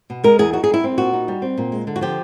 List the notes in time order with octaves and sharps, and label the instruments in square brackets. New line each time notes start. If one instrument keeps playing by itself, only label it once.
[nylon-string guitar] B2
G#3 A#4
E2 G#4
D#4 F#4
G#4
G3 E4
C4
A#2 F#4
D#4
G3
C4
A#2
G#3
D3
F#4
F3 G4